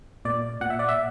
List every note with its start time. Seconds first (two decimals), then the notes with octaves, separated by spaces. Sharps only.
0.25 A#2 D5
0.61 A#2 F#5
0.70 E5
0.79 D5
0.89 E5